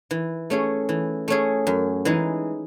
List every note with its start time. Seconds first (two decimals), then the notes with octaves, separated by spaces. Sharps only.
0.11 E3
0.50 A3 C#4 G#4
0.89 E3
1.28 A3 C#4 G#4
1.67 F#2
2.05 E3 G#3 D#4